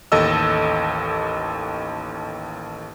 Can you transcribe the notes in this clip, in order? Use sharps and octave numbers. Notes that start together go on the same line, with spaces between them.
A1 D#2 A4 D#5 E6